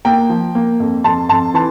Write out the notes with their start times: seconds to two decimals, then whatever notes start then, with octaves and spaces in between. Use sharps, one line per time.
0.05 A#3 G5 A#5
0.29 F3
0.55 A#3
0.80 F2
1.04 F2 A5 C6
1.29 F2 A5 C6
1.54 E3 A5 C6